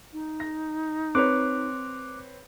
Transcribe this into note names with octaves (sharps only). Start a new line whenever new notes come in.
D#4
A#6
C4 B4 C#5 D6 F#6